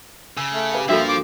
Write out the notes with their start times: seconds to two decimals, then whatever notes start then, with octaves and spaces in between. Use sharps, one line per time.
0.37 C#3 E6
0.54 A3
0.73 G4 B4 F5
0.89 G2 F3 A#3 D4 F#4 A4 E5 B5
1.09 D6